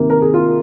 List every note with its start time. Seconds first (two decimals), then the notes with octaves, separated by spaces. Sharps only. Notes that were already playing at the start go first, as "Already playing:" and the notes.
Already playing: C3 D#3 A#3
0.10 A#4
0.22 G#4
0.34 F4